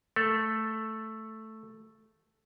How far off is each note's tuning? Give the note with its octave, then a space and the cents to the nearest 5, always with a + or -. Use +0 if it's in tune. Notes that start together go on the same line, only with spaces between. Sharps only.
A3 +0 A4 +0